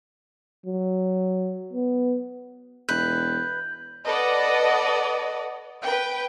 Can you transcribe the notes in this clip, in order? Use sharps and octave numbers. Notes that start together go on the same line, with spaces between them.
F#3
B3
E1 B4 G6
A4 B4 D5 D#5 F#5
B4 G5